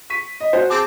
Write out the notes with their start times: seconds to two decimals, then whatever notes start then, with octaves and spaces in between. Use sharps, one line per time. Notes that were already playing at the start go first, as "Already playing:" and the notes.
0.10 C#6 B6 D#7
0.40 D#5
0.53 F#4 C5
0.70 C4 G#4 A5 D6